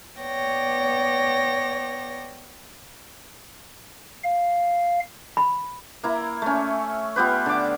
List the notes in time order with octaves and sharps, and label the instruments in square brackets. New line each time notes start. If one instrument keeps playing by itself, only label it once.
[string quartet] B3 C#5 D5 G5 A#6
[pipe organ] F5
[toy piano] B5
[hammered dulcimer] A#3 E4 A#5
A3 C#4
B3 F4 G4 B4
D3 D6